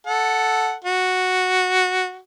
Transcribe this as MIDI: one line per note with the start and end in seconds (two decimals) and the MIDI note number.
0.06 0.74 69
0.06 0.74 78
0.84 2.17 66